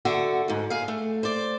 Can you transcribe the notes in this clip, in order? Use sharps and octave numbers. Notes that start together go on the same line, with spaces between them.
D3 F#4 E5
D2 G#2
G#4 F5
A3
C5 D5